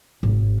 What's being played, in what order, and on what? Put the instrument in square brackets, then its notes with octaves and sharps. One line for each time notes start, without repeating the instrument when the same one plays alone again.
[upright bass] G#1